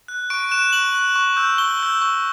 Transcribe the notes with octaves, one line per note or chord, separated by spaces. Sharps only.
F#6
C#6 D7
F#6 E7
C#6 F#7
F#6
C#6
E6 G6
C#6 G7
E6 G6
C#6